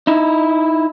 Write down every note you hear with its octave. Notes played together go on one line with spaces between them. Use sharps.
D#4 E4